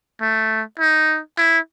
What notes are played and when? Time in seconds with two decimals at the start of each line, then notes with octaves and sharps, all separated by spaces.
0.21 A3
0.79 D#4
1.38 E4